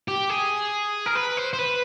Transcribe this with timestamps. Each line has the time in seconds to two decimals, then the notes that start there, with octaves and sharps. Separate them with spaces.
0.08 G4
0.30 G#4
1.06 A#4
1.15 B4
1.37 C5
1.53 C5
1.59 B4